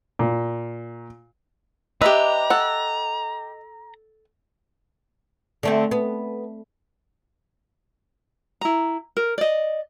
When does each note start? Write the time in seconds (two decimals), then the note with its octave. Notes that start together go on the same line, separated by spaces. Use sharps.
0.19 A#2
2.02 D4 G4 B4 D#5 E5 A#5
2.50 A4 F#5
5.63 D3 A3 C4
5.91 B3
8.61 E4 A#5
9.17 A#4
9.38 D5 D#5